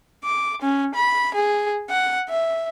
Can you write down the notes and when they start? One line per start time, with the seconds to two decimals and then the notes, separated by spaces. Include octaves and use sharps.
0.24 D6
0.62 C#4
0.95 B5
1.34 G#4
1.90 F#5
2.29 E5